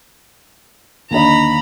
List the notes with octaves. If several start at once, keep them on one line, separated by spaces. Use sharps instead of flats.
D#2 D3 D#5 A#5 B5